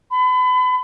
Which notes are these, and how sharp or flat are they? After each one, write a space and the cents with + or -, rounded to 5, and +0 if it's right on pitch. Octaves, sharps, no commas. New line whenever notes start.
B5 +35